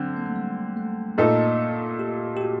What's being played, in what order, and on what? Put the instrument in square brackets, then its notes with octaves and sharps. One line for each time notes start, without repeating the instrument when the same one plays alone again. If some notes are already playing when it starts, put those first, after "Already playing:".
Already playing: [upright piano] D3 C4 [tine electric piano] F#3
[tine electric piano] A#3
A3
G3
A3
[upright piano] A#2 A3 D#4 A4 [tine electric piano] A#3
[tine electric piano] G4
G4
F#4